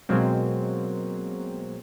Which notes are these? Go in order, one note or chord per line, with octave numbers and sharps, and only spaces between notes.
B2 F#3 G#3 A#3 C4